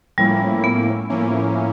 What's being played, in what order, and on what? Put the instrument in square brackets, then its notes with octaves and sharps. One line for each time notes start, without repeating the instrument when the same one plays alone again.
[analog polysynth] A2 F3 A#3 C#4 E4 [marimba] G3
[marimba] B3
[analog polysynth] A2 F3 A#3 C#4 E4